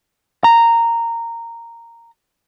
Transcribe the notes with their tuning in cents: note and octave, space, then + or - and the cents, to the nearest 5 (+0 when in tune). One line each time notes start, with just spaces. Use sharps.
A#5 -10